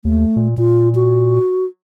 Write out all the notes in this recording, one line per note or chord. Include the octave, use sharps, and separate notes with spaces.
D#2 A3
A#2
A#2 F4
F#4